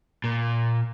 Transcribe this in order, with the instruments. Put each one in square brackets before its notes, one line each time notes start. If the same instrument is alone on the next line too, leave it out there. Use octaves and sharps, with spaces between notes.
[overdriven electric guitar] A#2